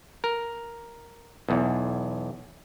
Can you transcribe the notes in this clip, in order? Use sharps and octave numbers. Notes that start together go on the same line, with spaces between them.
A#4
B1 E2